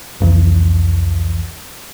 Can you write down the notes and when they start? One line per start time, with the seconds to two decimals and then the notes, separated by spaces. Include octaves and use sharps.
0.20 C2 F2 E3